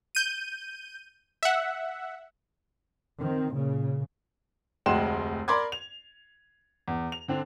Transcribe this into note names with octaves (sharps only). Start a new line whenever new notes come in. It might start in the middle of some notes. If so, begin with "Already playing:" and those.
G6 D#7
E5 F#5
D#3 C4
A#2 C#3
F1 D2 G#3 G5 C6 E7
A#4 D5 B5 C6 D6 G#6
F7
E2
F7
D3 C4 D4